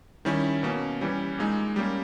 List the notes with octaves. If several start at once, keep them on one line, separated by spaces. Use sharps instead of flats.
D#3 G3 C#4 E4
B2 A#3 C#4
E3 G3 C#4
A#2 G#3 D#4
G3 A#3 C#4